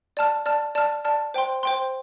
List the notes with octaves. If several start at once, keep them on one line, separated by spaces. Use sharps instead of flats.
D5 A5 F6
D5 A5 F6
D5 A5 F6
D5 A5 F6
C5 G5 C6
C5 G5 C6